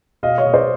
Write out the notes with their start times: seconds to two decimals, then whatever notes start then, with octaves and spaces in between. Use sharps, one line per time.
0.23 B2 D#5 F5
0.38 C#5 D#5
0.46 B2
0.54 C5 D5